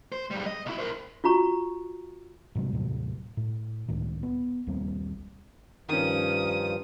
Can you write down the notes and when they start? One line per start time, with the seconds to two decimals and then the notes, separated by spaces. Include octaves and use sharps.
0.12 C5
0.31 G#2 G3
0.46 D#5
0.66 B1 E4
0.79 A#4 C5
1.24 F4 F#4 A#5 C#6
2.55 G#2 C3 F#3 G3
2.72 D#2 A2 C3 F#3
3.37 A2
3.88 C#2 A2 D#3
4.23 B3
4.67 A#1 D#2 G3 C4
5.89 G2 D#3 F3 C#4 D#6